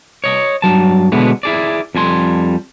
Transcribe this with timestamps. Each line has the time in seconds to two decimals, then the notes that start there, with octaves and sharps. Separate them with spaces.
0.24 C#5 D#5
0.62 G2 F#3 A5
1.12 B2 D3 G#3 B3 E4
1.43 E4 G#4 D5
1.95 F2 G3 G#5 C6